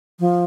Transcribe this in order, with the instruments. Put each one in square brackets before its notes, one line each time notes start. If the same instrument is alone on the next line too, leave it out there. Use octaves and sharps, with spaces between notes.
[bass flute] F3